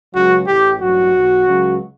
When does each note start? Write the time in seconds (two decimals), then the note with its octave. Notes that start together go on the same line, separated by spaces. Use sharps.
0.13 C#2 C#3 F#3 F#4
0.47 A1 A2 E3 G4
0.80 A1 G2 F#3 F#4
1.12 B1 B2 F#3
1.46 C#2 C#3 F#3